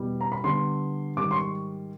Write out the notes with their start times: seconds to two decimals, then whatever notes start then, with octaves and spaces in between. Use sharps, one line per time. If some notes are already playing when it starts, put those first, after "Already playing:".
Already playing: E2 B2 G3
0.21 A#5
0.32 B5
0.44 D3 G3 B3 C6
1.16 G#2 D#3 G3 D6
1.31 C6
1.35 C#6